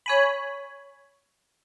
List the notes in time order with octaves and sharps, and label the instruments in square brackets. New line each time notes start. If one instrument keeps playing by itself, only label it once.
[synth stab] C#5 G#5 B5